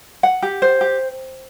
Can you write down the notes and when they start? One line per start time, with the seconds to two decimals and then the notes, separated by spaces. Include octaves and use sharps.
0.23 F#5
0.42 G4
0.62 C5
0.81 G4